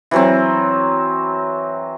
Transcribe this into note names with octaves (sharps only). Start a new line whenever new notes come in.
E3 F#3 C4